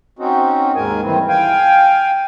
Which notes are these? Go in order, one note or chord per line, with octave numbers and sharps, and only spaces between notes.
C4 C#4 D#4 F#4
D#2 G#2 G#3 A#4 G#5
D#3 E3 G3 C4
F5 G5 G#5